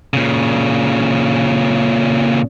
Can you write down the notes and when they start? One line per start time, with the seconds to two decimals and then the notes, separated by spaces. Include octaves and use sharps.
0.14 A#2 C#3